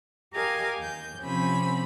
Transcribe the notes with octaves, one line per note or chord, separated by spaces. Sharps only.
G4 A#4 D#5 F5 G#5
D#2 G6
C3 F3 C4 C#4 B5